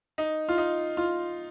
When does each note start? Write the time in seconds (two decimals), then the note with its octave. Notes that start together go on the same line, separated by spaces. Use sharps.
0.18 D#4
0.49 F4
0.58 D#4
0.97 F4